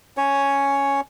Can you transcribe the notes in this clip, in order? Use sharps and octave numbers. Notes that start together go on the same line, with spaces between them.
C#4 C#5